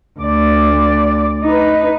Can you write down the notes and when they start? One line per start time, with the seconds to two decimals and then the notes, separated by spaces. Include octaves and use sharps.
0.20 D2 D5
1.43 D#4 B4